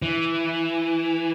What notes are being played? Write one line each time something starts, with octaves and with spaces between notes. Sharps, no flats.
E3